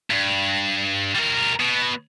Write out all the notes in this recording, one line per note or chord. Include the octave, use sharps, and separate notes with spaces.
G2
G3 A#4
B2